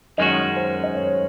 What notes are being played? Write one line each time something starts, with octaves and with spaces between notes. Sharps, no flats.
F#2 D#3 G#3 C#4 F#4 D#5
C5
D#5
C#5